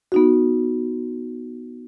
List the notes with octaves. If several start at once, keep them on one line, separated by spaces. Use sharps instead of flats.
B3 D#4 F#4